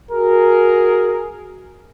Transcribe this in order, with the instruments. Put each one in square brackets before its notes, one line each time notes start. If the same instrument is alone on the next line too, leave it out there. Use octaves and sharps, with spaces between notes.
[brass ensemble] F#4 G#4 A#4